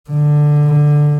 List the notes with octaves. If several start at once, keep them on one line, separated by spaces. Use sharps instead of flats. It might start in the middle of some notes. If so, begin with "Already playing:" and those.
D3